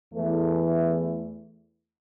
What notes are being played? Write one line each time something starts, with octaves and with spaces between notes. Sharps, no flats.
E2 E3 A3